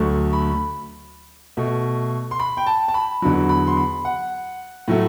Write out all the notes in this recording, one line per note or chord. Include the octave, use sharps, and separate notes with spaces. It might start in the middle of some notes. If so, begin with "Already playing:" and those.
Already playing: D2 D3 F#3 A3
B5
B2 A3
C6
B5
G5
A5
A5
B5
E2 D3 F#3 B5
B5
C6
B5
F#5
A2 F#3 A3